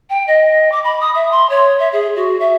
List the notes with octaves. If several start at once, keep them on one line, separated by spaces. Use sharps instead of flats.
G5
D#5
D6
B5
D#6
E5
C6
C#5
E5
G#4
F#4
E5